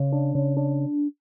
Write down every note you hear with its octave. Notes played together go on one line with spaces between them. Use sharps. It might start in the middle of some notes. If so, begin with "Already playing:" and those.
Already playing: C#3
D4
C#3
D4